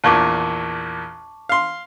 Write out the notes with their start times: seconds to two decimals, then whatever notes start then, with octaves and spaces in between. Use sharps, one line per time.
0.04 A#1 E2 A#2 A5 C#6 D6
1.49 F5 C6